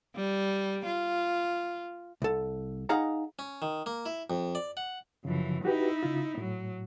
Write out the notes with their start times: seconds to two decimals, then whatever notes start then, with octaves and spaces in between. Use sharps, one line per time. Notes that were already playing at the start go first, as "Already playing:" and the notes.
0.16 G3
0.86 F4
2.22 C2 A4
2.89 D#4 G#4 D#5 F5 F#5 A#5
3.39 C#4
3.62 D#3
3.86 A#3
4.06 E4
4.30 F2
4.55 D5
4.77 F#5
5.25 F#2 C#3 E3 F3
5.65 D#4 E4 F#4 G4 B4
6.03 C#3 F4
6.38 A2 F#3